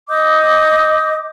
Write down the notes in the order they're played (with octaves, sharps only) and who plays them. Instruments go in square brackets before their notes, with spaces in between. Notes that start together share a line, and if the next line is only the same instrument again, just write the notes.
[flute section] D#5 D6 D#6 G6